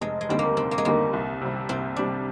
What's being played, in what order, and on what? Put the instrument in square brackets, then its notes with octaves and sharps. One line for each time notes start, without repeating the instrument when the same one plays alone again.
[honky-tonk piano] F1 [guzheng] G#3
[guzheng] G#3
[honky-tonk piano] D#2 D3 G3 [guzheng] C4
[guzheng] A#3
[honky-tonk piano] F1 [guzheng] C4
[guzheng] A#3
G#3
[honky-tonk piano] D#2 D3 G3 [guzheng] A#3
[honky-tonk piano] C2
C3 G3
[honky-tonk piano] C2 [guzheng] C4
[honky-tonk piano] C3 G3 [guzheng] D4